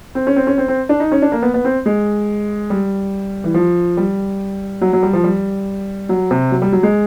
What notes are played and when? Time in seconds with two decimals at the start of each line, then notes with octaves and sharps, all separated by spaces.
0.15 C4
0.27 C#4
0.36 C4
0.47 C#4
0.58 C4
0.68 C4
0.89 D4
1.00 D#4
1.12 C#4
1.22 D4
1.32 A#3
1.42 B3
1.54 B3
1.65 C4
1.86 G#3
2.70 G3
3.44 E3
3.54 F3
3.97 G3
4.81 F#3
4.93 F#3
5.03 G3
5.13 F3
5.24 G3
6.09 F#3
6.31 C3
6.51 F#3
6.62 G3
6.72 F#3
6.83 G#3